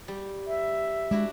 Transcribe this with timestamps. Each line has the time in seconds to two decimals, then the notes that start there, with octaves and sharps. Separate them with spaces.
0.08 G3
0.47 E5
1.11 G#3 D4 E4 F#4